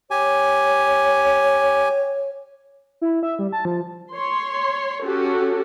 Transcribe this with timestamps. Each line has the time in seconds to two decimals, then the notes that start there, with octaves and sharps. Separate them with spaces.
0.11 G4 C#5 G#5
3.01 E4
3.23 E5
3.39 G3
3.52 A5
3.65 F3
4.12 C#5 C6
5.03 C#4 F#4 G4 A4